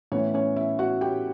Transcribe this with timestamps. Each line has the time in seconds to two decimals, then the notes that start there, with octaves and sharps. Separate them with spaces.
0.12 A2 E3 B3 C#4 C#5
0.34 C#4 C#5
0.56 E4 E5
0.79 F#4 F#5
1.01 G4 G5